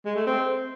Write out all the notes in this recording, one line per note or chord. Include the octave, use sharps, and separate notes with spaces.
G#3
A3
C4